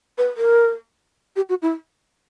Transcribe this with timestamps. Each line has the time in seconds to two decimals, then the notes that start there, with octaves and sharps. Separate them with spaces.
0.18 B4
0.37 A#4
1.36 G4
1.49 F#4
1.62 E4